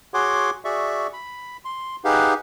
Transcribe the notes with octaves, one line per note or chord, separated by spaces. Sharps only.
F#4 G#4 C#5 F#5 C6 D6
F#4 G#4 D5 E5 C#6
B5
C6
D#4 G4 G#4 B4 F5 F#5